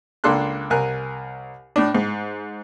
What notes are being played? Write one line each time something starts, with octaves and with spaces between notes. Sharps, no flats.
C#2 A#3 D4 A4 C6 F#6
C2 A#4 G#5 F#6
A2 D4
G#2